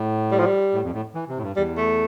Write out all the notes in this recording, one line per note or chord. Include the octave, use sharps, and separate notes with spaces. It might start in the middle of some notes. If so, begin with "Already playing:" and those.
Already playing: A2
G3
F3
G3
A2
F2
A2
E3
C3
A2
G2
E2 G3
A3